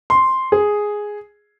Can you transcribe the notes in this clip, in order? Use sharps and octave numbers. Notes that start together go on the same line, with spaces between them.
C6
G#4